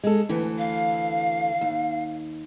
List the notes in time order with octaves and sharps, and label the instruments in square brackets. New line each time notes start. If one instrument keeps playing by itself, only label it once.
[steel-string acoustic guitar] G#3 A4
D2 E3 A4
[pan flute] F5
[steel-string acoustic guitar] D#2